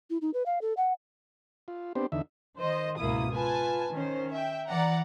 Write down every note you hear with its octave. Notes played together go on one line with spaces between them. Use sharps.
E4
D#4
B4
F5
A4
F#5
F4
B3 C4 D4 G4 C5
E2 D3 D#4 E5
D#3 C5 D#5
C#2 G#2 B2 A#3 E4 D#6
F4 B4 G#5 A5
D#3 C#4 C5
E5 G5
E3 D5 F#5 A#5